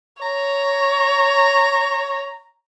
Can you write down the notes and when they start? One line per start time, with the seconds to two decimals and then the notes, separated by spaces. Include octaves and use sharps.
0.22 C#5 A#5